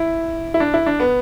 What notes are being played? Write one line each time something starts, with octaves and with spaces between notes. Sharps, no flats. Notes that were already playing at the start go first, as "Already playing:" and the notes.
Already playing: E4
E4
D4
E4
D4
B3